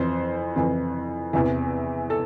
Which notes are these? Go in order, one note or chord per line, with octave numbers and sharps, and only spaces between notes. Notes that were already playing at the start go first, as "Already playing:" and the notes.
Already playing: F2 E3 C5
F2 E3
E2 C3 E3
A4